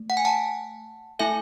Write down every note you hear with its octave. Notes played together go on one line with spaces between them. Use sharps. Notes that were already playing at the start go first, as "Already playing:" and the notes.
Already playing: A3
F#5
G#5
F#5 A5
A3 E4 A4 E5 G#5